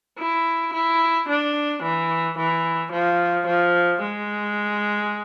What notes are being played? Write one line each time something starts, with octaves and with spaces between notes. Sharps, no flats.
E4
E4
D4
E3
E3
F3
F3
G#3